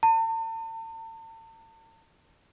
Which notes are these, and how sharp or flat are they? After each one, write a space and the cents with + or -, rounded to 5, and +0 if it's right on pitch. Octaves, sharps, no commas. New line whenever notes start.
A5 +45